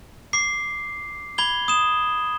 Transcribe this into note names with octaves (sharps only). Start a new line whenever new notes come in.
D6 C7
B5 G#6 G7
D#6 E7